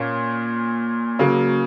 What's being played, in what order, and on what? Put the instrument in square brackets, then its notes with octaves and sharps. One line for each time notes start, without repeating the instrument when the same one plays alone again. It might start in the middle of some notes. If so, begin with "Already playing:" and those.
Already playing: [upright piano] A#2 A#3 C#4
C#3 F#3 A#3